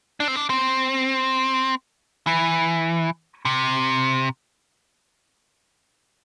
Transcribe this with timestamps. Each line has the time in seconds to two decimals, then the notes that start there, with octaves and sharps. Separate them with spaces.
0.20 D4
0.28 C4
0.36 D4
0.50 C4
2.27 E3
3.45 C3